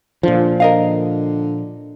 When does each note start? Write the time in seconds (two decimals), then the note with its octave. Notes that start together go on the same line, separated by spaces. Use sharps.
0.23 A#2 D3 F3
0.60 D3 A#4 D#5 F5